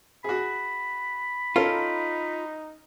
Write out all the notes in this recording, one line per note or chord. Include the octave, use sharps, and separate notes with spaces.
F#4 G#4 B5
C#4 D#4 F4 A4 A#4